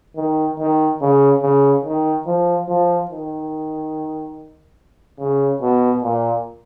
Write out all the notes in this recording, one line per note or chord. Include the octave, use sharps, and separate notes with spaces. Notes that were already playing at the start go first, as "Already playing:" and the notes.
D#3
D#3
C#3
C#3
D#3
F3
F3
D#3
C#3
B2
A#2